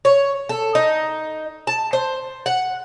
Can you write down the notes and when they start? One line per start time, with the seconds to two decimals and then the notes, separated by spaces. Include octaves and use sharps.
0.05 C#5
0.49 A4
0.75 D#4
1.67 A5
1.93 C5
2.46 F#5